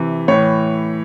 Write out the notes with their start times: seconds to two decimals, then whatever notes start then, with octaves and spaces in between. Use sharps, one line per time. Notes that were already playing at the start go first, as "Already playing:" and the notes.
Already playing: C3 E3
0.28 A2 E3 C#5